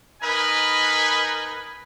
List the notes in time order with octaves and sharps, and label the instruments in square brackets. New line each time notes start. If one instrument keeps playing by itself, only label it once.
[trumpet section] D#4 A#4 B4 D#5 G#5 B5